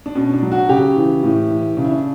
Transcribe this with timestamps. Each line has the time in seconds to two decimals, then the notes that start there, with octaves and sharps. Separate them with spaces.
0.06 D4
0.15 B2 C#4
0.33 D4
0.43 F#3
0.51 F#4
0.69 C#3 G4
0.96 E3
1.23 A2
1.50 E3
1.77 C#3 D4
1.84 E4
1.91 D4